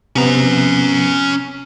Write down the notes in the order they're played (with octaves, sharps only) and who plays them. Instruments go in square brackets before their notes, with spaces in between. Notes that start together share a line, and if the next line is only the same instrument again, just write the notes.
[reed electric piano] C3 B3 [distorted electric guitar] C#4 A#5